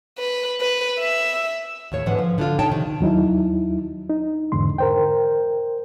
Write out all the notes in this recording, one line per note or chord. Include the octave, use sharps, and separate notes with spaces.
B4
B4
E5
D#2 A2 C#5
G#2 D3 E3 G#3 F#5
F3
D3 D4 F4
A#2 D#4 C#5 G5 A5
C3 D#3
D#2 F#3 D#4 E4
D#4
E2 G#2 D3 C6
A#4 C5 G5